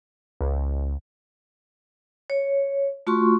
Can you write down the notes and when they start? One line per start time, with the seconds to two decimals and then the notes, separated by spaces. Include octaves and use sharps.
0.41 C#2
2.30 C#5
3.07 A3 F4 F#4 C6 C#6